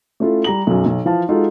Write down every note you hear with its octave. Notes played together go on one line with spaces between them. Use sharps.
A3 C#4 E4 F4 A4
G3 A#5 F#7
B1 F#2
B1
E3 F3 F5 A5
G#3 D#4 F4 F#4 A4